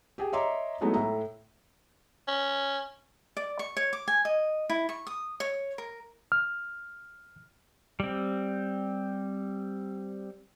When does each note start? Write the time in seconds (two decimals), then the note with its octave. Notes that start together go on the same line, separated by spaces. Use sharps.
0.18 G4 G#4 G5
0.33 C#5 D#5 E5 A#5 C6 D6
0.81 F#3 G#3 A3 B3 D#4 E4
0.94 A2 E5 A#5
2.28 C#4
3.37 D5
3.59 C#6
3.77 C#5
3.93 D6
4.08 G#5
4.25 D#5
4.70 E4
4.89 C#6
5.07 D#6
5.40 C#5
5.78 A#4
6.32 F6
8.00 G3 C4